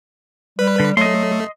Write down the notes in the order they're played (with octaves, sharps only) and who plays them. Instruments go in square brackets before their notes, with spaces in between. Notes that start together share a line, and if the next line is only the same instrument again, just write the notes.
[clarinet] G3 [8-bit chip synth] B4
[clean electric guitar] D3
[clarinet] F#3 [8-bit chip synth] A3 [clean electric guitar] D#5 C6